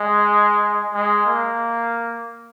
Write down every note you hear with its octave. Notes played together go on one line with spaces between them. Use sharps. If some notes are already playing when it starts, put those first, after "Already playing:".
Already playing: G#3
G#3
A#3